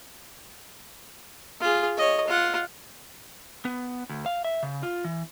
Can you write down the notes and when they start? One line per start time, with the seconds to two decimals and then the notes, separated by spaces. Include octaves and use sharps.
1.61 F4 G#4
1.97 C#5 D#5
2.27 F4 F#5
3.65 B3
4.09 D2
4.26 F5
4.45 E5
4.63 C#3
4.83 F4
5.04 E3